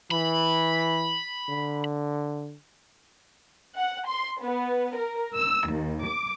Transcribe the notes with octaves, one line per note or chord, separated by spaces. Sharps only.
E3 B5
D3
F#5
C6
B3
A#4
E6
D#2
D6